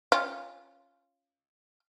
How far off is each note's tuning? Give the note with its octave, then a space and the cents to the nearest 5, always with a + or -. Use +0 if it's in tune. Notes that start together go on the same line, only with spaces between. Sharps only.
C#4 +0 F4 -5 G5 +20